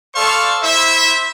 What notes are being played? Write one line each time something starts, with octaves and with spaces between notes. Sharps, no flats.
A4 C5 D5 F5 C#6
E4 C5 E5